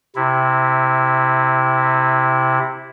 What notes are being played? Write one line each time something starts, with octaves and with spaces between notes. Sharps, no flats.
C3 E4